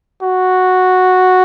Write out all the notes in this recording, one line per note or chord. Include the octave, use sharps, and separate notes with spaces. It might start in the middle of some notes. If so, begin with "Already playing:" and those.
F#4